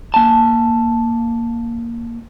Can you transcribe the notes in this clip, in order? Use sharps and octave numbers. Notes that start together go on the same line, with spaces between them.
A#3 G#5 A5